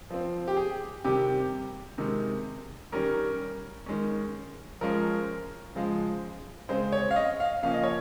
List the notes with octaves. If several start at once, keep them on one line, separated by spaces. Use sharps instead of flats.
F3 C4
G4
G#4
C3 D#3 G3 G4
C3 D#3 G#3
D#3 G3 C#4 A#4
D#3 G#3 C#4
F3 G#3 C#4 A#4
C#3 F3 G#3
C#3 G#3 C4 C5
C#5
F5
D#5
F5
C#3 F3 A#3 C#4 F5
D#5
C#5